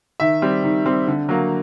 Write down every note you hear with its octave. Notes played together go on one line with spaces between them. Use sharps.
D#3 E5
G3 C4
D#3
G3 C4
D3
F#3 A#3